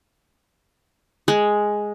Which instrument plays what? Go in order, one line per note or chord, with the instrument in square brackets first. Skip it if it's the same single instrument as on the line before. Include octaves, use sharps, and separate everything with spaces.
[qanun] G#3